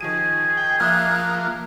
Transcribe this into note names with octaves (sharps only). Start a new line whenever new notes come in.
D#3 F3 G#4 D#7
G5
F3 A#3 E5 D#6 F6 F#6